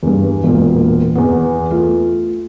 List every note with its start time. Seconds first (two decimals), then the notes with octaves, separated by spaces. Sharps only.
0.03 E2 G2
0.43 E1 A#2
1.15 E2 B3
1.71 A3 F4